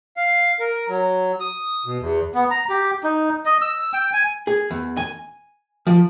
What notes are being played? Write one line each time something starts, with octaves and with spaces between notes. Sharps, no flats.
F5
A#4
F#3
D#6
B2
E2
B3
A#5
G4
D#4
D#5
E6
G5
G#5
G#4
E2
G#5
F3